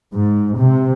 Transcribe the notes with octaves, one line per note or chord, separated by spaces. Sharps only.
G#2
C3